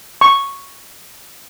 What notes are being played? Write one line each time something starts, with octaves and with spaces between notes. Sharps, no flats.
C#6